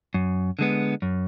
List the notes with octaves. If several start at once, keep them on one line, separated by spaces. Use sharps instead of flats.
F#2
D3 G#3 B3
F#2